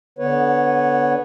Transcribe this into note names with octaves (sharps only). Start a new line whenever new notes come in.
D3 B3 B4 C#5